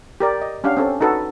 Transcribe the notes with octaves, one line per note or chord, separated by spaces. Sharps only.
G4 A#4 D5
D#5
C#4 D4 G4 F5 F#5
C4 C#4 A4
D#4 F#4 A4 B4